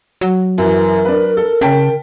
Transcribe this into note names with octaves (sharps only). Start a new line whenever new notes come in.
F#3
F#2 E3 A#4
D4 B4
A4
C#3 G5 A5 B6